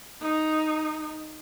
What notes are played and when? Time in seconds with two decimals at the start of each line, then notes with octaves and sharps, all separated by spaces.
0.21 D#4